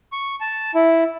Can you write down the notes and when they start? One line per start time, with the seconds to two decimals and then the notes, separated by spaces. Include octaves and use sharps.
0.12 C#6
0.41 A5
0.75 E4